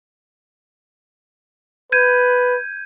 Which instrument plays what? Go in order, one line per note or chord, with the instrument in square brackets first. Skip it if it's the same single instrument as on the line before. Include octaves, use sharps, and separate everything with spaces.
[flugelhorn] B4 [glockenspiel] G6 G#6 D#7